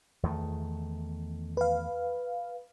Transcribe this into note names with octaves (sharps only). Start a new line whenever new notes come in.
E2 D#3 A3
B4 F5